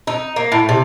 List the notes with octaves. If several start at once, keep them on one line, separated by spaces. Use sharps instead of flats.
D#4
A#3
A2
C3